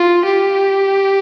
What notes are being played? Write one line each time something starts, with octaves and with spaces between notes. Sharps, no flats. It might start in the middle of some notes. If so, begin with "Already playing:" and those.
Already playing: F4
G4